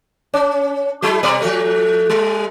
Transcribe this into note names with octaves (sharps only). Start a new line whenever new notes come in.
C#4
F#3 G#3 E4
B2 G3 D5
F3 A3
G3